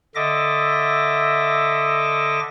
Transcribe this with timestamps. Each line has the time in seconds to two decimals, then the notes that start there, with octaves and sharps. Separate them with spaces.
0.15 D3 A4 D#5 E5 D6 A#6